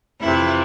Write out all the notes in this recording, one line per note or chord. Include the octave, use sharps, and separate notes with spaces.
F2 C3 E3 E4